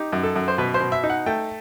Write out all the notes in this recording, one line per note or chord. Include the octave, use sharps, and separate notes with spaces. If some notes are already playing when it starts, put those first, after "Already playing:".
Already playing: D#4 G4
F#2
A4
F#2
C5
B2 B4
C5
B2
E5
D#4
F#5
A3 G5